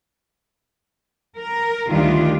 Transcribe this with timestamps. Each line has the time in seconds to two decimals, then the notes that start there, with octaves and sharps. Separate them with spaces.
1.37 A#4
1.87 D2 D#3 G3 D4 F4